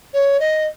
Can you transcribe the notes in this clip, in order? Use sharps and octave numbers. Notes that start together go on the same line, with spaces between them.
C#5
D#5